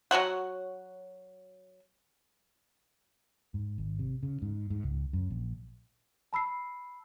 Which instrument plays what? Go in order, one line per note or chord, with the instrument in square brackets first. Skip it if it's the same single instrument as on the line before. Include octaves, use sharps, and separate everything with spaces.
[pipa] F#3 F#4 C#5 F#5
[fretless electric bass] G#2
G#1
C3
C#3
G#2
G#2
C#2
F#2
A#1
[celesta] A5 B5 E6 C7